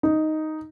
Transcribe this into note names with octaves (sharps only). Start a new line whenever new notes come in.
D#4